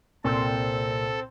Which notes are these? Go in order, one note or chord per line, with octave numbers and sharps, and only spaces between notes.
C2 A#2 C4 A4